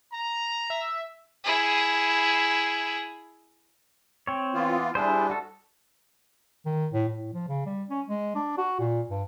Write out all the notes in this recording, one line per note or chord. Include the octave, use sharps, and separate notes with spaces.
A#5
E5
E4 G#4
C4 C#5
E3 B3 F4
G3 D4 E4 G#4 C5
F#4 A4
D#3
A2
A2
F3
C#3
G3
C#4
G#3
D4
F#4
A#2
G2